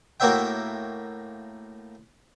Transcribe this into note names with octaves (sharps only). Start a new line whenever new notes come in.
A2 A#3 F#4 C#5 E5 G5